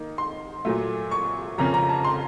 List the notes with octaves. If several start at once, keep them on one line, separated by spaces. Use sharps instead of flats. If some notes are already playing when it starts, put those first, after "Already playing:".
Already playing: D#3 A#3 D#4
C6
A#2 F#3 A3
C#6
F2 C#3 F3 A#3 C#4 A#5
A#5
A5
C6